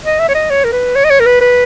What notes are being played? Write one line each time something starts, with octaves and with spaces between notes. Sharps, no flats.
D#5
E5
C#5
D#5
C#5
A#4
B4
C#5
D#5
C#5
A#4
B4
B4